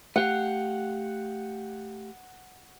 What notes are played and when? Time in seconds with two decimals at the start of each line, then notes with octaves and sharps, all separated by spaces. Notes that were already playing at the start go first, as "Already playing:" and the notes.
0.16 A3 G4 F5 F#5